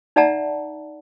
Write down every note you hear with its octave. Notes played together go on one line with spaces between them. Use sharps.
D#4 D5 E5 F#5 A5 A#5